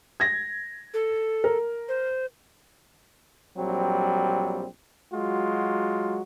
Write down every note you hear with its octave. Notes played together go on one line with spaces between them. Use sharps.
G#6 A#6
A4
A#4
C5
A#1 F#3 G3 C4
F#3 G#3 F4 F#4